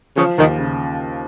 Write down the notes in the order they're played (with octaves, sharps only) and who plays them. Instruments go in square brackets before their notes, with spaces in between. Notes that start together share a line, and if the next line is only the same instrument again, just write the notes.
[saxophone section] C#3 [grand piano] F3
[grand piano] D#2 [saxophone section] D#3
[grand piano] C#3